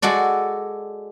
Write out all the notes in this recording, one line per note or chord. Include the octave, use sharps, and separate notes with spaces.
G#3 F#4 A4 D5